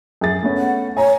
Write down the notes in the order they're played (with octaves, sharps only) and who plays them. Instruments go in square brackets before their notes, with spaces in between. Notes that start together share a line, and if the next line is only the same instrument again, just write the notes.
[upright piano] F#2 G#4 A6
A3 B3 C#4
[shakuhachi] F#5
[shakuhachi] C#5 [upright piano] G#5 A#5